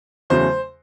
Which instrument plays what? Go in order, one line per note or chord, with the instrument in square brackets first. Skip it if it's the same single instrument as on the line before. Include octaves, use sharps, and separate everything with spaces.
[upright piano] E2 C#3 F#3 A3 C5